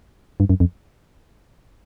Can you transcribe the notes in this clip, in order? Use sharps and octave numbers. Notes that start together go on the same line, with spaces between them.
G2
F#2
F2